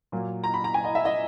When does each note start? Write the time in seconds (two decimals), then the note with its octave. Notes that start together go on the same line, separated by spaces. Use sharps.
0.12 A#2 F#3 A#3
0.44 A#5
0.54 B5
0.64 A#5
0.74 G#5
0.84 D#5
0.95 E5
1.05 D#5